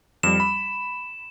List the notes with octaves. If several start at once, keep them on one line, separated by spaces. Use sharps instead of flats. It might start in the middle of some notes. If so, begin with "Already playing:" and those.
F2 G3 E7
B5